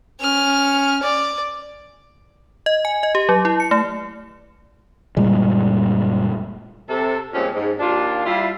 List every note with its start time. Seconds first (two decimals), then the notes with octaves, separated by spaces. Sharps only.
0.21 C#4 F6
1.02 D5
2.66 D#5
2.85 G#5
3.03 D#5
3.15 G4
3.29 F#3
3.45 E4
3.60 C#7
3.71 A3
5.17 F#1 A#2 G3 G#3
6.89 C3 A4
7.34 F2 A#2 G3 G#3 C4 C#4
7.54 G#2
7.80 D#2 D4 F4
8.25 G3 E4 F4